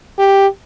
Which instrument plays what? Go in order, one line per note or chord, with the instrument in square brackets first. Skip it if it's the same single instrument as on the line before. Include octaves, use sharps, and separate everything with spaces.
[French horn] G4